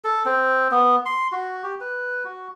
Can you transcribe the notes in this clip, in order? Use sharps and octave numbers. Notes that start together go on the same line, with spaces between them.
A4
C4
B3
C6
F#4
G4
B4
F#4